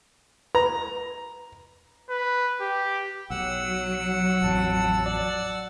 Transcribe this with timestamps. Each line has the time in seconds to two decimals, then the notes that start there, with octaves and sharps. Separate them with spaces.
0.55 B4 A#5
2.10 B4
2.61 G4
3.30 B1 F#3 F#5 E6
4.42 A1 F2 A5
5.05 D5